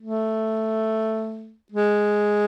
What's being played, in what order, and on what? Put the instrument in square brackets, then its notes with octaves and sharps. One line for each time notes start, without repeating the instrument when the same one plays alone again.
[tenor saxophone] A3
G#3